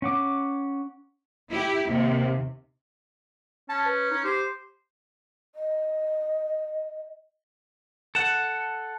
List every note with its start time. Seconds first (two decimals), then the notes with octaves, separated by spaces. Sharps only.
0.02 C#4 F#5 D6
1.50 E4 G4
1.89 D#2 C3
3.69 C#4 A5
3.86 B4
4.11 D#4
4.24 G4 C5
5.55 D#5
8.15 A4 F#5 E7